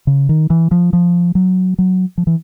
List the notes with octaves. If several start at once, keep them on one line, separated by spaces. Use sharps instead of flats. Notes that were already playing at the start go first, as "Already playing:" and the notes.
C#3
D#3
E3
F3
F3
F#3
F#3
F3
E3